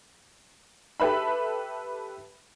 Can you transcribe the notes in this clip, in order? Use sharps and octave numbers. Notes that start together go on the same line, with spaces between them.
G4 A4 B4 E5 B5